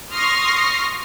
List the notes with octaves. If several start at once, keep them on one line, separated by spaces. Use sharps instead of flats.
C6 C#6 D#6 F6 A#6 C7